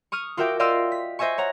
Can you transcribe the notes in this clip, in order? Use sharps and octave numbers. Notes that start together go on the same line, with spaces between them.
C#6 D#6 F6 D#7
F4 F#4 A#4 E5 G5 D6
D5 D#5 F5 G5 C6 E6
B6
C5 D#5 E5 G#5 C#6
C#5 F#5 A#5